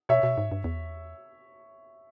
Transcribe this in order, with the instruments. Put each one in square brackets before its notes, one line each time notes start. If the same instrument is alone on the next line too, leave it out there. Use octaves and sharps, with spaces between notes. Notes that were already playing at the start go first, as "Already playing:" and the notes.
[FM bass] B2 [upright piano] C#5 E5
[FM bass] B2
G#2
G2
E2